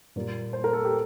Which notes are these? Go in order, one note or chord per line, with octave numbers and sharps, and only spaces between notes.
A#2 G3 A#3
C5
A#4
A4
G4